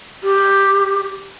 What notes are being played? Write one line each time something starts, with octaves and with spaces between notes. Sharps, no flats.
G4